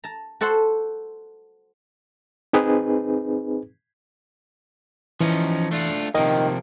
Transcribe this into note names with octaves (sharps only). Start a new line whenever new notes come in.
A5 A#5
F#4 A4 C5 F#5 C6
C4 D#4 G#4 B4
E3 F3 C#4 D#4
A3 D4 F4
C3 D#3 F3 A#3 D#5